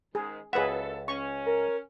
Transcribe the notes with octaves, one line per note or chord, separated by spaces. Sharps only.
G#2 D#3 G#3 G#4
C#2 F#2 G#4 A4 B4 E5 F#5
C#4 C#6
A#4